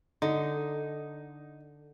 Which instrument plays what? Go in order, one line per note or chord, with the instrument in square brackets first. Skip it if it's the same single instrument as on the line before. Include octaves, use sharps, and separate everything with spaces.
[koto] D3 [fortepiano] D#4